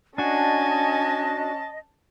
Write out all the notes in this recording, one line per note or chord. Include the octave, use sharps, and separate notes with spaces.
C#4 D4 F#4 D#5 G#5 A5